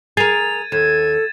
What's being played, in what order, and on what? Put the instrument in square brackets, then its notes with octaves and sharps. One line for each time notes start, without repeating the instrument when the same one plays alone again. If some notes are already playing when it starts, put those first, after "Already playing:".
[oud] G#4 A#4 [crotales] G#6 A6 D#7 [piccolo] F7
[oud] D#2 [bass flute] A4 [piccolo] G#6 [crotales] E7